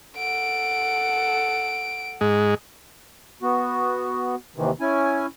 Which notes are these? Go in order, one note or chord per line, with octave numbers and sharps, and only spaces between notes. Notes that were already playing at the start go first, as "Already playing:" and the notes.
A4 F#5 D7
G#2 G#3
B3 F#4
D#2 C3 D#3 E3
C#4 E4 G#5